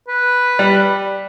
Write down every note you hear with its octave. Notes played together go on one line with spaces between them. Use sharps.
B4
G3